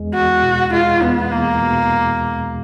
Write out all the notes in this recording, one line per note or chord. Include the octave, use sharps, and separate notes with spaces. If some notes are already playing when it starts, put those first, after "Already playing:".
Already playing: E2 G#3
E2 F#4
B2
G#3 F4
E2 B3
E2 A#3
B2